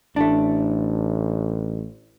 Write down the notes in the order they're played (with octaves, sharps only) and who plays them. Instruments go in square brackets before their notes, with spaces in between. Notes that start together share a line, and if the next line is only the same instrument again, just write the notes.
[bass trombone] A1 [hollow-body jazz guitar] A3 D4